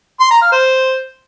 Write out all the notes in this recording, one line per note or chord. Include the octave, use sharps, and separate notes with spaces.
C6
A#5
F5
C5